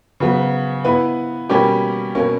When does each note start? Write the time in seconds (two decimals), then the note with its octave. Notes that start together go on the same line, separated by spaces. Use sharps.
0.20 C#3 F#3 B3
0.85 B3 E4 B4
1.49 B2 G3 A#3 C#4 G4
2.15 B2 A#3 C#4